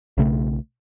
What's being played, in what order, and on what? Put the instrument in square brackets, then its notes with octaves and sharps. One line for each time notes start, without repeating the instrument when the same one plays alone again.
[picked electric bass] B1 C#3 A3